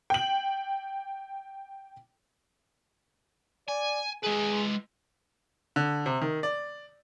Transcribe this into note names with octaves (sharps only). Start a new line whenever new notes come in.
G5 F#7
D5 G#5
G#3 G#4 B4
D3
C3
D#3
D5